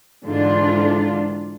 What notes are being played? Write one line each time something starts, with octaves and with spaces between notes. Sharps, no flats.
G#2 D3 E3 D4 F4